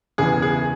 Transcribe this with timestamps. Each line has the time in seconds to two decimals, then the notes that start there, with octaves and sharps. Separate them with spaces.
0.18 E2 C#3 E3 G#4
0.42 G#4